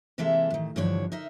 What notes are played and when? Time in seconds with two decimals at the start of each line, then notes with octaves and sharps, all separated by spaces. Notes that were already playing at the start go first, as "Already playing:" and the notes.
0.18 C3 E3 G#3 A#3 A4 E5
0.50 A2 D#3
0.76 G2 D3 E3 F3 D4 C#5
1.12 D#4 A#4 E5